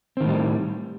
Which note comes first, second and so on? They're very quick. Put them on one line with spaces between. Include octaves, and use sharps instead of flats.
C4 D#3 A2 G3